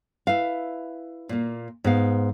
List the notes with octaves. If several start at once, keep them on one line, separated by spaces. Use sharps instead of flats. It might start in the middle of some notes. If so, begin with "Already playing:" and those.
E4 B4 F5
A#2 A#3
G#2 B3 F5